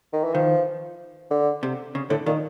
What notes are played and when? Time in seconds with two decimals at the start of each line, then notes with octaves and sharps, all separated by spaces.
0.13 D#3
0.24 E3
0.34 D#3 F3
1.31 D3
1.63 C3
1.95 C#3
2.10 A2 D3
2.26 A#2 D#3